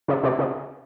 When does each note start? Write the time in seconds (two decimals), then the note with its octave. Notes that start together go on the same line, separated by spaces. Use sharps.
0.08 C#3
0.23 C3
0.38 C#3